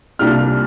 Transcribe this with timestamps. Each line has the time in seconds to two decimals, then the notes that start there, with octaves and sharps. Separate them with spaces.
0.19 C2 A#2 G3 D4 F6